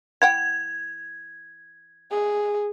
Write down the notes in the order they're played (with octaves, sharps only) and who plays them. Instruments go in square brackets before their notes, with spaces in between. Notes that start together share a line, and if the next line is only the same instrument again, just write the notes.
[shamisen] E3 F#5 G5 [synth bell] G#6
[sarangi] G#4